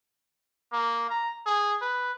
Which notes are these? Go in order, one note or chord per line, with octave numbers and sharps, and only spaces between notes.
A#3
A#5
G#4
B4